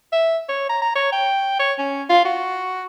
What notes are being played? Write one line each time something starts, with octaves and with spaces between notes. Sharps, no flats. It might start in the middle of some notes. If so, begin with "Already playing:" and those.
E5
C#5
A#5
A#5
C#5
G5
C#5
C#4
F4
F#4